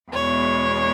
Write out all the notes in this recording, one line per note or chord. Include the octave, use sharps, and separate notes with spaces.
E2 B2 G#3 C#5